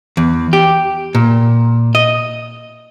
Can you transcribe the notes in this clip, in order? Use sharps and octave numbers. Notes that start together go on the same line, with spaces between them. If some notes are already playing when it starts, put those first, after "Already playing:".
E2
G4
A#2
D#5